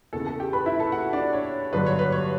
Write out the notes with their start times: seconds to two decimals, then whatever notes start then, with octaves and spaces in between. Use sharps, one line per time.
0.13 E2 C#3 E3 A4 A5
0.26 A4 A5
0.40 G4 G5
0.53 B4 B5
0.66 E4 E5
0.80 A4 A5
0.92 F#4 F#5
1.13 D4 D5
1.33 C#5
1.73 G2 D3 F#3 B4
1.86 C#5
1.99 B4
2.12 C#5